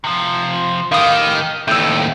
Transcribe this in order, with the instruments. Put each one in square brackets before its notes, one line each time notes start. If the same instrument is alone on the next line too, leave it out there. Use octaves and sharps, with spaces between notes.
[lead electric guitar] C3 F3
[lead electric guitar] A2 G4 [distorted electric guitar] D#3 [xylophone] F5 D#6
[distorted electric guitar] D#2 A2 [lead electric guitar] D#3 G5 [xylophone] E6 G6